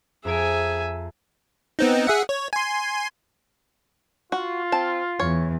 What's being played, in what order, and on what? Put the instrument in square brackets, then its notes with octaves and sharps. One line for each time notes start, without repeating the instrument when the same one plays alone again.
[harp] F2 A#5 D7 [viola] G#4 [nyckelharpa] E5 G#5
[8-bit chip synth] B3 C4 D#4
G#4 E5 F#5
C#5
G#5 C6
[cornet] F4 [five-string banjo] F#4
[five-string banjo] C4 A5
[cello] E2 [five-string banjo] C#5